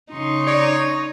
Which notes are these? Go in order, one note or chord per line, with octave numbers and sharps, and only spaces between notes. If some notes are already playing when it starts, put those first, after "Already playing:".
C#3 D#4 C6 C#6
C#5 D5